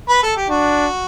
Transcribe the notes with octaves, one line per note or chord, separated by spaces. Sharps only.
B4
A4
G4
D4 F#4